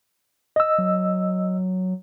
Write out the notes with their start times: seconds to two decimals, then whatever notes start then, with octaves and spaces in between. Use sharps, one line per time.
0.56 D#5 E6
0.78 F#3